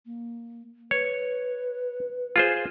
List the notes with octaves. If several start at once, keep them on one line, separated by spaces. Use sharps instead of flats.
A#3
B4 C#5
F4 G#4 C5